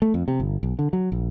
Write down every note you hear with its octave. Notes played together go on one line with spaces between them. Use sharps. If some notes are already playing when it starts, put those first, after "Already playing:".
A3
F2
C3
G1
B1
D3
F#3
A#1